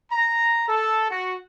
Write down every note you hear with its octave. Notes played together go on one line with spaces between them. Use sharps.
A#5
A4
F#4